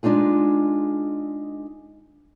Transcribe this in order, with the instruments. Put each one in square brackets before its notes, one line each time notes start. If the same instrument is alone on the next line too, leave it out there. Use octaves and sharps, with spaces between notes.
[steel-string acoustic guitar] G#3 D4 D#4 F4 G#4